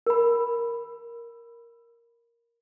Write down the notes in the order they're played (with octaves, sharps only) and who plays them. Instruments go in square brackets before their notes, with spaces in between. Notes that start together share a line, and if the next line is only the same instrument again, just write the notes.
[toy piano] A#4 B5